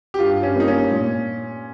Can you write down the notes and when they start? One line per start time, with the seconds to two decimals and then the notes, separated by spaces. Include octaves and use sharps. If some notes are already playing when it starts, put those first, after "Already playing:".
0.14 G4
0.19 G2 F4
0.43 C#4
0.55 G3 A#3 D#4 F4
0.68 C#4
0.91 A#2